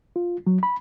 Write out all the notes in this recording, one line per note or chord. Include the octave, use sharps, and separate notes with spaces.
F4
F#3
B5